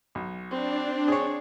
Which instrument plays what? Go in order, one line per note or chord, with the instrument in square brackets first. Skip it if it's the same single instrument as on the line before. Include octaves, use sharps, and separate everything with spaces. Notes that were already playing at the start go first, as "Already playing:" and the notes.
[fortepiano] B1
[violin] C4 [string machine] D4
[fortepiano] G#4 C#5